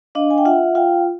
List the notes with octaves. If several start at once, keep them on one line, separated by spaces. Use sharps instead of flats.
D4 D#5 F5
G#5
G5
F4 E5 F#5
F4 F5 G5